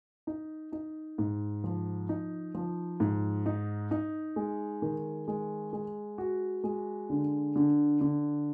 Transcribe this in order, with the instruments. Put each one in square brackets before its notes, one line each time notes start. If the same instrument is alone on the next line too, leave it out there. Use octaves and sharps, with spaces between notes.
[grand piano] D#4
D#4
G#2
F3
D#4
F3
G#2
D#4
D#4
G#3
D#3
G#3
G#3
F#4
G#3
D3
D3
D3